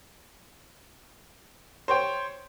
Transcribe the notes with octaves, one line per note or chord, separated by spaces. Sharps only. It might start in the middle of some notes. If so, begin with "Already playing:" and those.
C5 C#5 G5